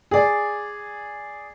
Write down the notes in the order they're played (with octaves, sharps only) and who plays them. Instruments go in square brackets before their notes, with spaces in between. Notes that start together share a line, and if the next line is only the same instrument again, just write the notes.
[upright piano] G#4 D5